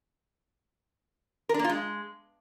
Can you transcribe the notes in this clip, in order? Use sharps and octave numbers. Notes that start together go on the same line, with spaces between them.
A#4
D4
A#3
F4
G#3